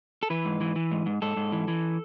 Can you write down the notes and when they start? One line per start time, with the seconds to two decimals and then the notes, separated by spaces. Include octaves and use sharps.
0.23 A4
0.30 E3 B4
0.45 G#2
0.61 E3
0.76 E3
0.91 G#2
1.06 G#2
1.22 G#2 A4
1.37 G#2
1.52 E3
1.68 E3